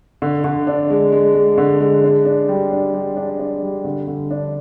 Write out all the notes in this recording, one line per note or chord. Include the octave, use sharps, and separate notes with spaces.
D3
D3
D4
G#3
G#3
G#3
D3
G#3
D4
D4
G3
D4
G3
D4
D4
G3
D3
D3
D4